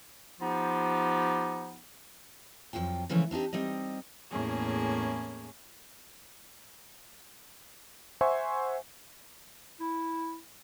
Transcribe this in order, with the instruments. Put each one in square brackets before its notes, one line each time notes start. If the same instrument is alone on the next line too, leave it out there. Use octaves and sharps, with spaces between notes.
[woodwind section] F3 B3 D#4 F4 G4
[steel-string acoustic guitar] F2 G#2 F#3 F4 G5
C#3 E3 F3 G#3 A3 C#4
C4 D4 D#4 G4
G3 C4 D#4 D#5
[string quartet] E2 A2 A#3 C#4 G#4
[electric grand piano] C5 E5 F#5 G#5 C6 C#6
[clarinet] E4